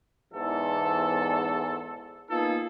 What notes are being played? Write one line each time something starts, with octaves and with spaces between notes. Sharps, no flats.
E2 G#2 A4
A#3 B3 D#4 F4 G#4 A4